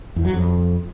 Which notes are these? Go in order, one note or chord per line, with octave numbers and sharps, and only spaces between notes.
E2
F#3
F2